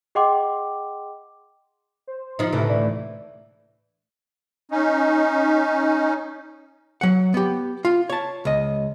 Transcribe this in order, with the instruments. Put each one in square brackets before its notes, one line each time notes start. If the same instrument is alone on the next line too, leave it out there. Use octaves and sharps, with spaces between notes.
[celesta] G#4 D#5 F#5 G5 C6 D6
[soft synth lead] C5
[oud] F3 D#4
[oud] D2 A2 E3 [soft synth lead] C3
[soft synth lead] D5
[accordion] C#4 D#4
[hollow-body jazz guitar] F#3 F#5
B3 G4
F4
C#5 A5
C#2 D#5